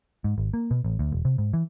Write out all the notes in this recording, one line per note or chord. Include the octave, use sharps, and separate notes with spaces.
G#2
G#1
A#3
B2
A1
D2
E1
C3
G#2
E3